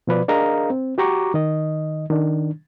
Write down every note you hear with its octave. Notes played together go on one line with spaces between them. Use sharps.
B2 F3 B4 D5
D4 G#4 A#4 D#5 F5 A#5
C4
F#4 G4 A#5 C#6 D6
D#3 D#5
D#3 D4